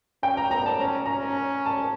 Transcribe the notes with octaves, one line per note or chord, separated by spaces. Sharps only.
C#4 G5
A#5
B3 A#5
A5
C#4 A#5
C#4 A#5
A5